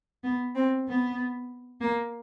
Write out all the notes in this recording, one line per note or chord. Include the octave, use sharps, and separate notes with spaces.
B3
C4
B3
A#3